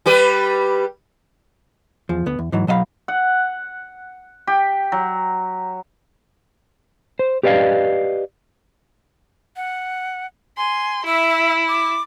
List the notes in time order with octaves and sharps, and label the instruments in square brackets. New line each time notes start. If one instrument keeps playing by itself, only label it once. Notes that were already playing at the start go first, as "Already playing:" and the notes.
[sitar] G3 G4 B4
[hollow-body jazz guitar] E2 F3
D2 B3
E2
G#2 E3 F#3
B1 F#3 D#5 F5 B5
[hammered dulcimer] F#5
G4
F#3
[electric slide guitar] C5
G4 B4 D5 D#5 F5
[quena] F#5
[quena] G#5 [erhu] C6
[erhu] E4 [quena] E5
[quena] D6